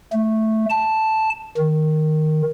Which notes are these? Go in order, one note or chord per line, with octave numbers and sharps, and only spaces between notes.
A3
A5
D#3